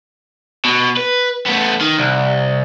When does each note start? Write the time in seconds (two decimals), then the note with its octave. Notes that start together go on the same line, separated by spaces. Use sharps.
0.65 B2
0.97 B4
1.46 A3 B3
1.81 D#3
1.98 C2